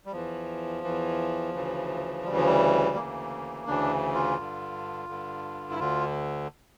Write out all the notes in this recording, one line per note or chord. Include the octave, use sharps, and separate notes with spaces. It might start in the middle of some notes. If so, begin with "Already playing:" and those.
G3
E2 E3 F3
E2 E3
D2 C#3 E3
D2 C#3 E3 G3
F3
G3
D2 C#3 E3 A#3
D2 C#3 E3 D4
F4
G2 D3
G2 D3
E4
D2 D3 F4